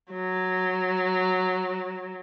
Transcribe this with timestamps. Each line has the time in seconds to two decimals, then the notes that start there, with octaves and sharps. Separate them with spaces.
0.13 F#3